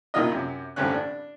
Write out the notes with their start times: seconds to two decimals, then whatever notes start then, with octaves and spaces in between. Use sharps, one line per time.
0.14 G2 A#2 D#3 E4 F4 D#5
0.32 F#2 C3
0.76 A1 G2 D3 C4 C#4 F#6
0.94 D4